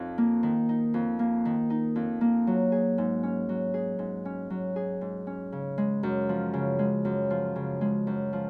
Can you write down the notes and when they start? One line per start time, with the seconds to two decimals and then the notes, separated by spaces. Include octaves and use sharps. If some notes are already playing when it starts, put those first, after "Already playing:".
Already playing: F2 D#4
0.18 A#3
0.43 D#3
0.69 D#4
0.94 F2
1.19 A#3
1.45 D#3
1.70 D#4
1.96 F2
2.21 A#3
2.47 F#3
2.72 G#4
2.98 G#2
3.23 C#4
3.49 F#3
3.74 G#4
3.99 G#2
4.25 C#4
4.50 F#3
4.76 G#4
5.01 G#2
5.27 C#4
5.52 C#3
5.78 G#3
6.03 F#2
6.29 F3
6.53 C#3
6.79 G#3
7.05 F#2
7.30 F3
7.56 C#3
7.81 G#3
8.07 F#2
8.33 F3